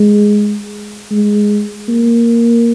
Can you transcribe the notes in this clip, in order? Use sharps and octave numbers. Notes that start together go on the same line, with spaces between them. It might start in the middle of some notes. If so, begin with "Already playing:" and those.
Already playing: G#3
G#3
A#3